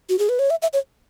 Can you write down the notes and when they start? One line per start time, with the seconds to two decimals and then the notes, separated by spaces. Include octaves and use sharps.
0.09 F#4
0.19 G#4
0.29 B4
0.39 C#5
0.50 E5
0.62 E5
0.73 C#5